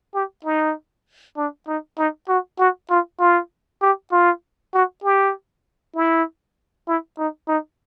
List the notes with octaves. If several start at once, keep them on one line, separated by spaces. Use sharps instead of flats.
G4
D#4
D4
D#4
D#4
F#4
F#4
F4
F4
G4
F4
F#4
G4
E4
E4
D#4
D#4